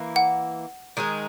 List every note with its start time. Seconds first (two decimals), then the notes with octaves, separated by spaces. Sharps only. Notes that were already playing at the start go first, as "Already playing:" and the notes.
Already playing: E3 A#3 E4
0.16 F#5
0.97 D#3 G#3 D#4 G#4